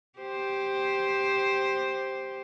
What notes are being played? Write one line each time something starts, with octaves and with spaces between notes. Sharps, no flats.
G4 C5